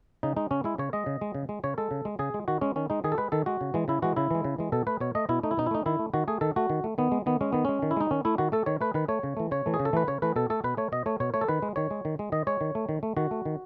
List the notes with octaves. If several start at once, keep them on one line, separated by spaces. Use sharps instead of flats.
C#3 D#4
G#3 D#4
C#3 C#4
G#3 E4
C#3 C#5
G#3 D#5
C#3
G#3
C#3
G#3
C#3 C#5
G#3 A4
C#3
G#3
C#3 G#4
G#3
D#3 F#4
G#3 C#4
D#3 C#4
G#3 D#4
D#3 G#4
A4
G#3 B4
D#3 A4
G#3 F#4
C#3
E3 G#3
C#3 E4
E3 G#3 F#4
C#3 E4
E3 G#3
C#3
E3 G#3
B2 A4
A3 B4
B2 C#5
A3 D#5
B2 E4
A3 D#4
E4
B2 D#4
E4
A3 D#4
D#3 E4
A3
D#3 F#4
A3 G#4
D#3 A4
A3 F#4
D#3
A3
D#3 B3
G#3
D#3 B3
G#3 C#4
D#3 B3
G#3 C#4
D#3
E4
G#3 D#4
D#3 C#4
A3 E4
D#3 F#4
A3 A4
D#3 C#5
A3 B4
D#3 B4
A3 C#5
C#3
E3 A3
C#3 C#5
E3 A3
G#4
C#3
A4
E3 A3 B4
C#3 C#5
E3 A3 B4
B2 A4
A3 A4
B2 B4
A3 C#5
B2 D#5
A3 C#5
B2 C#5
A3 C#5
A4
D#3 B4
G#3
D#3 C#5
G#3
D#3
G#3
D#3 D#5
G#3 C#5
D#3
A3
D#3
A3
D#3 F#4
A3
D#3